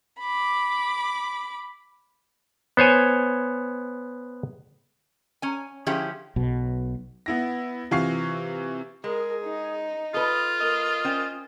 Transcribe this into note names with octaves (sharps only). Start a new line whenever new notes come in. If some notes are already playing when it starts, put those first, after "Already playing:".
B5 D6
B3 C5 C#5 G#5
C#4 G#5
D3 F3 C#4 E4 G4 G#4
B1 B2
B3 E4 A#6
C3 E3 F4 F5 C#6 C7
G#3 G#4 A#4
D#4
F4 A4 B4 D#5
A#3 D#5
C#4 C5 G5